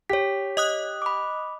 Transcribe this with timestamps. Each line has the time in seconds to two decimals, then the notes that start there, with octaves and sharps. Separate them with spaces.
0.10 G4 C#5 B6
0.57 D#5 D#6 F#6
1.02 B5 D6